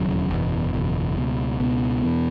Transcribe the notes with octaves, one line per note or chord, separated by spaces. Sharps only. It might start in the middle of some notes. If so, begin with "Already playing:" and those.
Already playing: E1 D#2 C#3 F#3
F#1 E2 B2
F#1 E2 B2
C#2 B2
C#2 B2 B3
E2 B2